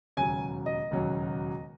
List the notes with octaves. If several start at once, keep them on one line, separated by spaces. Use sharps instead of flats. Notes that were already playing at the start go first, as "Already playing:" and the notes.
E1 D#2 C#3 F#3 G#5
D#5
E1 D#2 C#3 F#3